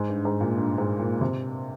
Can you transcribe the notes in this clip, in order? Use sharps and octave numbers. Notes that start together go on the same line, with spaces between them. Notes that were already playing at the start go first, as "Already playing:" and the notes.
Already playing: G#2
G2
G#2
A#2
G2
G#2
A#2
C3